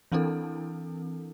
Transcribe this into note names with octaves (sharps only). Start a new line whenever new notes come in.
E3 C4 D4 E4 A4 A#4